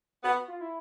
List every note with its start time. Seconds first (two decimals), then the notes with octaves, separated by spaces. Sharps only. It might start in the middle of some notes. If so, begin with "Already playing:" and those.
0.23 B3 F#4
0.48 F4
0.61 E4